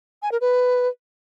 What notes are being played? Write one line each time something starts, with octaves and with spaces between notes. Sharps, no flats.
G#5
A#4
B4